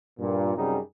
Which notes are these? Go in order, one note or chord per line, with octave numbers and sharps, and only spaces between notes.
G2 A#2
F#2 C3 G3 D#4 G#4